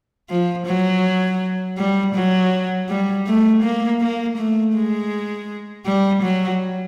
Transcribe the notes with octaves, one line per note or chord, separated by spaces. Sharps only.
F3
F#3
G3
F#3
G3
A3
A#3
A#3
A3
G#3
G3
F#3